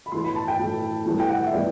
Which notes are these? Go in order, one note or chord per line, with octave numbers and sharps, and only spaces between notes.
B5
A2 E3 A3 C6
B5
A5
G5
A2 E3 A3
A2 E3 G3 B3
G5
F#5
E5
A2 E3 G3 B3 D5